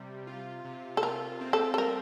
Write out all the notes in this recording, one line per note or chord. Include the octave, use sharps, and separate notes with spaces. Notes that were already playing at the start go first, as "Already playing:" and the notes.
Already playing: C3 G3
F4
C3
A4
F4 A#4
C4
A4
A4
G3 A#4